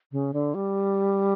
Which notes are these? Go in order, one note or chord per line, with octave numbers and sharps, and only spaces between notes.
C#3
D3
G3